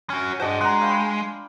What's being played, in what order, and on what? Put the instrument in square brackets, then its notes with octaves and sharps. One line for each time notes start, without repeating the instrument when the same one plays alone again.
[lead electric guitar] C#4 F#4
[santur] G#3 D4 F#4 [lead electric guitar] C5 D#5
[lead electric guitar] G#3 [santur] F#5 A#5
[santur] F5 G5 B5